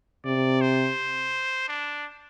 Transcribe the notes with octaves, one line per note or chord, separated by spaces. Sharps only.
C3 D5
C5
D4